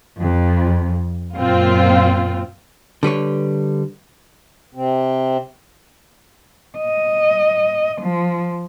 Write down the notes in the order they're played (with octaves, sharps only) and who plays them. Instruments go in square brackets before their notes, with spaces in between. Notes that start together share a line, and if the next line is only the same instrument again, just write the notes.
[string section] F2
F#2 A#2 C4 F4
[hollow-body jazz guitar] D3 G3 B4 C#5
[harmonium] C3 C4
[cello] D#5
F3